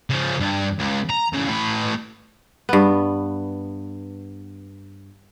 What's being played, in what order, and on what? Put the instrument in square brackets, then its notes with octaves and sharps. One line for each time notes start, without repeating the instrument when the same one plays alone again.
[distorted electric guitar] C#3 F3
G2
C#2
A#5
A2 C#3
A2 B4
[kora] G2 B3